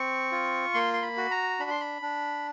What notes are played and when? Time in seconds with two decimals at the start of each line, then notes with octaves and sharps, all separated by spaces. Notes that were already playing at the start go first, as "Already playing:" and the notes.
Already playing: C4 C#6
0.32 F4
0.74 A#3 C6
0.94 C6
1.02 B5
1.17 F#4
1.31 A#5
1.59 D4 B5
1.70 C6
1.81 B5
2.02 D4